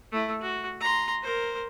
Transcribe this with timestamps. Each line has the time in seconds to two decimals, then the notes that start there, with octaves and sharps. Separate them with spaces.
0.12 A3 E4
0.41 F#4
0.80 A#5 C6
1.22 A#4 C5